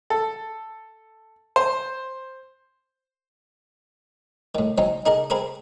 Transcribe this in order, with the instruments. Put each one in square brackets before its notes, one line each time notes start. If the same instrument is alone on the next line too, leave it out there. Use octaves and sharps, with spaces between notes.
[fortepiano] A4
C5
[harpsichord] A2 D#3
F#3 C4 C#4 D#4
D#4 G#4 A#4 D#5
C4 G#4 A#4 B5 D#6